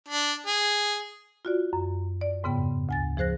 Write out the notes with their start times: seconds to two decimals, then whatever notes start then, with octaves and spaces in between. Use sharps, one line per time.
0.09 D4
0.47 G#4
1.45 F4 F#4 D5
1.73 F#2
2.21 D5
2.43 F2 G#2 C#3 B3 G5
2.89 D2 G#5 A6
3.17 F3 G#4 C5 F#6 A#6